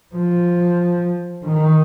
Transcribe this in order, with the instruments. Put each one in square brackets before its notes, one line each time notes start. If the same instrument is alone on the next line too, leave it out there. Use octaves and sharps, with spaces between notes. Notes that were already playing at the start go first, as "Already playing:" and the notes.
[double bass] F3
D#3